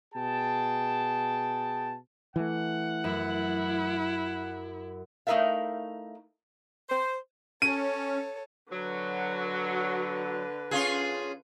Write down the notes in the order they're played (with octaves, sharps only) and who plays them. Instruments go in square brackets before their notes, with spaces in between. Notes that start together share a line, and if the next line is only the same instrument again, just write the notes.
[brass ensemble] B2 G#4 G5 A5
[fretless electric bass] E3 A3 [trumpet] F#5
[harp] F#2 [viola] E4
[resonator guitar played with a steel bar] A3 D#4 E4 A#4 E5 F5
[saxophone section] C5
[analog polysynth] C#4 [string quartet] A4 C#5 [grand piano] D#7
[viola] D3 B4 [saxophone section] F#3
[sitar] C#4 F4 G#4